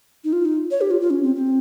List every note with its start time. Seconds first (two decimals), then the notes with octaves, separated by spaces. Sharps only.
0.24 D#4
0.33 F4
0.45 D#4
0.71 C#5
0.81 G4
0.91 F4
1.01 F4
1.10 C#4
1.23 C4
1.36 C4